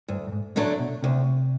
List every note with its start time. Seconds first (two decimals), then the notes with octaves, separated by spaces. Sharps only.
0.08 D2 G2
0.27 G2
0.32 G#2
0.56 A2 D3 F#3 A3 D4
0.79 B2
1.03 D2 C3